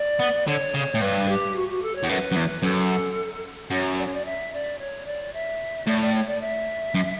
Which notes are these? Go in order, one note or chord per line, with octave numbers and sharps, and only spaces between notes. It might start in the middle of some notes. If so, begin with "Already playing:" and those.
Already playing: D5
B3
D3 C#5
C#3
A2
G2 B4
G4
F#4
F#4
A4
C#5
E2
F#2 B4
F#2
E2
F#2 A4
F#2 C#5
D5
C#5
D5
E5
D5
C#5
D5
E5
A2 D5
D5
C#5
D5
E5
F#2